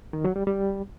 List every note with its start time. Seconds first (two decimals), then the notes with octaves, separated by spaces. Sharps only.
0.13 D#3
0.24 F#3
0.36 G3
0.47 G3